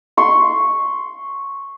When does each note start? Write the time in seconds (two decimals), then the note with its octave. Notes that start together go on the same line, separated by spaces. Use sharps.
0.17 C6 C#6